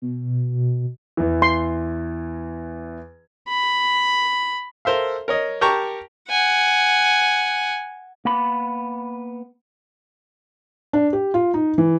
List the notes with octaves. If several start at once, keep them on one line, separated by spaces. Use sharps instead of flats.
B2
E2 E3
C6
B5
A4 A#4 C5 E5 F5
A#4 C#5 D#5
G4 A#4 G5 A5 A#5 C#6
F#5 G#5
A#3 B3 B5
D4
G4
F4
D#4
E3